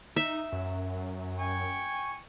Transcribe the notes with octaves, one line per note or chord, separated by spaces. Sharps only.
D#4 E5
F#2
G5 G#5 C#6